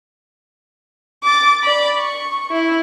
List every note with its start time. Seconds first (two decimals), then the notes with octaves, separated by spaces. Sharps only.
1.24 D6 A6
1.63 D5 B5
1.98 C#6
2.51 E4